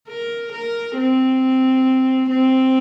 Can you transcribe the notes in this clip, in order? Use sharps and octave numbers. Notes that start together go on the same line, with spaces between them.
A#4
A#4
C4
C4